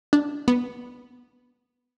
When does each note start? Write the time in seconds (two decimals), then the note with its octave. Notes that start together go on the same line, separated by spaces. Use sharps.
0.13 D4
0.48 B3